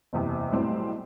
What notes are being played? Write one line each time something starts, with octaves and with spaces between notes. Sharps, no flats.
F#1 E2 C3
B1 A2 G3 C4